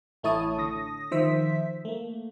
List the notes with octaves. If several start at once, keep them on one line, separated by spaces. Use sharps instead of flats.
A1 A3 E4 C#5 A5 D#6
D3 D#6 A#6
D#3 F3 C5 E5 B6
A3 A#3